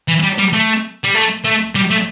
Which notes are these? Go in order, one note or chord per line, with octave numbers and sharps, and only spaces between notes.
E3
G3
G3
A3
G3
A3
A3
G3
A3